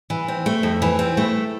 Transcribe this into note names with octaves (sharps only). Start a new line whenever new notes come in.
E3
C4
A3
F2
E3
C4
A3